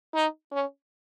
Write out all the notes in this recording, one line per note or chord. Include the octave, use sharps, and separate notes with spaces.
D#4
C#4